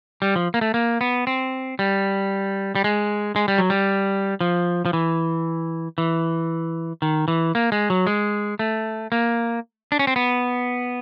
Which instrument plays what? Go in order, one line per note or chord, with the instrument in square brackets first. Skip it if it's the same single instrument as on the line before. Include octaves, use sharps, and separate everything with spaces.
[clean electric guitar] G3
F3
A#3
A3
A#3
B3
C4
G3
G3
G#3
G#3
G3
F#3
G3
F3
F3
E3
E3
D#3
E3
A#3
G#3
F#3
G#3
A3
A#3
D4
C#4
C4
B3